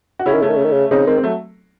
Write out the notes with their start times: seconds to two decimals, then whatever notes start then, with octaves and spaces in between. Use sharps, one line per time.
0.19 F#4
0.26 C#3 C#4 E4
0.34 D#3
0.42 C#3 A3 C#4
0.49 D#3
0.57 C#3
0.65 D#3
0.72 C#3
0.91 C#3 C4 D#4
1.07 D#3 G#3 C4
1.18 C4
1.23 F#3 A3